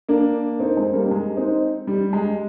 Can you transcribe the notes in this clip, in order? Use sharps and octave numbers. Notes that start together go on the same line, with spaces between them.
A#3 D4
C4 D#4
G#3 C4
G3 A#3
G3
G#3
C4 D#4
G3
G#3